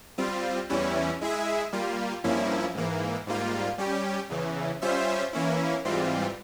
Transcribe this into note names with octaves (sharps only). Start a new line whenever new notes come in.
G3 C4 F4
E2 E3 G3 C#4 E4
G#3 E4 G#4 E5
G3 A#3 F4
G2 F3 A#3 C#4 E4
G#2 E3 A#3
G#2 G3 A#3 F4
G3 C#4 G4
E2 C#3 E3
G3 C#4 F4 C5 E5
E3 A#3 C#4 E4
G#2 E3 G3 C4 F4